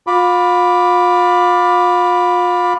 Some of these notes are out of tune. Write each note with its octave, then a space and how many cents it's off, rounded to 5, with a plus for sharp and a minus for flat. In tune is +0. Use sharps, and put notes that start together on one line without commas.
F4 +35 B5 +0 D6 +0